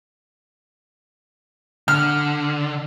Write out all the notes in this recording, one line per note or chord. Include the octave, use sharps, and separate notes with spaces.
D3 F6